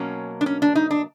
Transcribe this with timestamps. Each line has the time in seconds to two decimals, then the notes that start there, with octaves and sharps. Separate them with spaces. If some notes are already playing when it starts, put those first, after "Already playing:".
Already playing: B2 F#3 A#3 C#4
0.41 D4
0.46 C#4
0.62 D4
0.75 D#4
0.91 D4